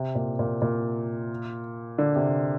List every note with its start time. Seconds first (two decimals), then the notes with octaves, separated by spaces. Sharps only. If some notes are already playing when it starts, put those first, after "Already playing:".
Already playing: C3
0.15 A#2
0.39 A#2
0.62 A#2
1.98 D3
2.16 C3